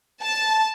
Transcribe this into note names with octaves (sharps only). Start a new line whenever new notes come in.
A5